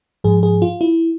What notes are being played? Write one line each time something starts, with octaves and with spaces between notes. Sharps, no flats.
G#2 F3 G#4
G#4
F4
E4